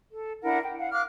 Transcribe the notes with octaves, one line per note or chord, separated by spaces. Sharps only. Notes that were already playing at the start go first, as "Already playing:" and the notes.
A4
D4 E4 A#4 F#5
G5
F5 F#5
F5 D6 F6 F#6